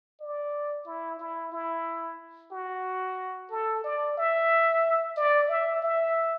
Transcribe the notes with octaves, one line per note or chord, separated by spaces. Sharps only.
D5
E4
E4
E4
F#4
A4
D5
E5
D5
E5
E5